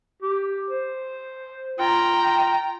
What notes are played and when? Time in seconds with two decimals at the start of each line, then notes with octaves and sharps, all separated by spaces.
0.22 G4
0.70 C5
1.79 F4 G5 A#5